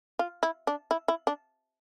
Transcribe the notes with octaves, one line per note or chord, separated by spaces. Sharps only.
F4
E4
D4
E4
E4
D4